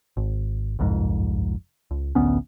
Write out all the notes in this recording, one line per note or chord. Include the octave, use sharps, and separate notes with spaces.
G#1
G1 C2 F2 G#2
C#2
A1 D2 B3 C#4